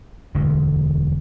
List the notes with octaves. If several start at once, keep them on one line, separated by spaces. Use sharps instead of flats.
E1 D2 D3 G#3